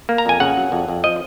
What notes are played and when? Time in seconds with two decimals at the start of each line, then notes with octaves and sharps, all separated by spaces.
0.09 A#3
0.18 A#5
0.26 F2 G#5
0.40 C#3 F#5
0.57 F#3
0.72 F2
0.89 F2
1.04 F3 D#5